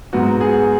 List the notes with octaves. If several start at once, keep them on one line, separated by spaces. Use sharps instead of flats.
G#2 F#3 B3 F#4
G#4